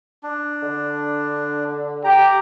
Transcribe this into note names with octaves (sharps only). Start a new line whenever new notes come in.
D4
D3
G4 A#5